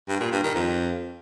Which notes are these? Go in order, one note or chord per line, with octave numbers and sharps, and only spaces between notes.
G2
A#2
G2
D#3
F2